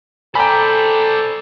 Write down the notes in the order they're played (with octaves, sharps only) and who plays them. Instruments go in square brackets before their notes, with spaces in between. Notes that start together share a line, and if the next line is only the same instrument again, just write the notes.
[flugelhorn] A4 [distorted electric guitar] C5 D5 [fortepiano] G5 B5 [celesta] G#5 A#5